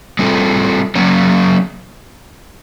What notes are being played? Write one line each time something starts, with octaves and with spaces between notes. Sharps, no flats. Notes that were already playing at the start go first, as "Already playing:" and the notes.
G3 C4 F4 A4
F#3 A#3 C#4